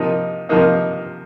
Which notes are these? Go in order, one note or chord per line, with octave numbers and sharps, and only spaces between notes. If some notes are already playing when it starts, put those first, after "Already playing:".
Already playing: C3 F3 A#3 D#4
C3 F3 A#3 D#4